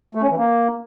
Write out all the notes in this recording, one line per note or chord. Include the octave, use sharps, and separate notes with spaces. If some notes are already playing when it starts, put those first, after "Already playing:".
A3
C#4
E3
A#3